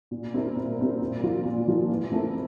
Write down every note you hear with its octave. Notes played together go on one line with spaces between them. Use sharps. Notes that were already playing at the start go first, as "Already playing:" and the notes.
A#2
G3 C4 E4 A#4
A#2
G3 C4 E4 A#4
A#2
F3 A#3 F4
A#2
F3 A#3 F4
E3
A3 C4 E4 A#4